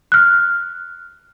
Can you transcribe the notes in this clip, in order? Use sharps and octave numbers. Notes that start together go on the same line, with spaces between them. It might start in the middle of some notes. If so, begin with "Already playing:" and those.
F6 F#6